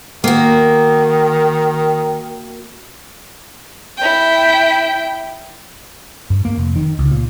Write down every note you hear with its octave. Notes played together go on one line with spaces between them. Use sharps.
D#3 A#3 F#4
E4 G5
G2
A#3
F1
D#3
C#2
A#2